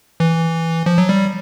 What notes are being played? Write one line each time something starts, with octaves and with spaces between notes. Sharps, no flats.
E3
F3
F#3
G3